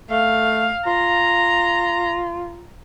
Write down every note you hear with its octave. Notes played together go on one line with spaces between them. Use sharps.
A3 F5
F4 A#5